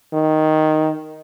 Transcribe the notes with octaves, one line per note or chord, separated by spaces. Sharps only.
D#3